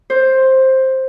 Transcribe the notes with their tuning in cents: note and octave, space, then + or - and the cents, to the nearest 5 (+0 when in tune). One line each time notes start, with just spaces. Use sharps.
C5 +10